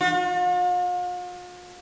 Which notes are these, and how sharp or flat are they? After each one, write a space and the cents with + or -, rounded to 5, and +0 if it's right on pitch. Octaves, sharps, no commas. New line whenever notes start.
F4 +45